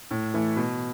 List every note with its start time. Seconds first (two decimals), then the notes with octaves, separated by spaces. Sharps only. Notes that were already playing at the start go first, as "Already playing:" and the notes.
0.11 A2
0.34 E3 A3
0.56 B2